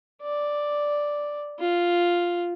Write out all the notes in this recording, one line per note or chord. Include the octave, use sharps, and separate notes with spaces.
D5
F4